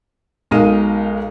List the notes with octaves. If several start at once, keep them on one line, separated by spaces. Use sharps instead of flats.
B1 G#3 D#4 A#4 F5 D#7